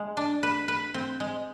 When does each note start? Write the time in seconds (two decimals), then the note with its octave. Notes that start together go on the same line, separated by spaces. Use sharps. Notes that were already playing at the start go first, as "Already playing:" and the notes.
Already playing: G#3
0.17 D4
0.43 B4
0.68 B4
0.94 C4
1.20 G#3